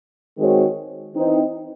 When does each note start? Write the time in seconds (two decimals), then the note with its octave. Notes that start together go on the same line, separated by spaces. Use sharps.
0.37 D#3 G#3 C4 F#4 C#5
1.14 E3 C4 D#4